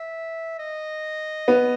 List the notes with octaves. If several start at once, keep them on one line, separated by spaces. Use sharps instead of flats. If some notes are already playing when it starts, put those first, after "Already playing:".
Already playing: E5
D#5
B3